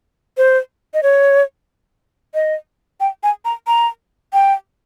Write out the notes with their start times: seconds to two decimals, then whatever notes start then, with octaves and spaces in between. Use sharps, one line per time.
0.38 C5
0.94 D#5
1.03 C#5
2.34 D#5
3.00 G5
3.23 G#5
3.45 A#5
3.67 A#5
4.33 G5